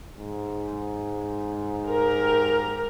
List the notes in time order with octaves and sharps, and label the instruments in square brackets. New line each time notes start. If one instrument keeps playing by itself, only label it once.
[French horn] G#2
[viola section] G4 A#4